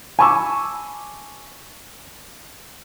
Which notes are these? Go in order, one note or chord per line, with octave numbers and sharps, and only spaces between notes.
G#5 A5 B5 C#6 D6 E6